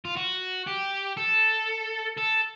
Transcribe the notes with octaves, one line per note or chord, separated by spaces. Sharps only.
F4
F#4
G4
A4
A4